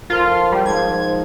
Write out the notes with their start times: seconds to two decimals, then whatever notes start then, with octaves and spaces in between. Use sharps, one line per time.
0.10 F3 F4 A4 A#4
0.52 G3
0.66 G#2 F3 G#6